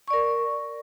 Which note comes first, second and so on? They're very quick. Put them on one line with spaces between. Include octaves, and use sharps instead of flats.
C#6 D5 A#4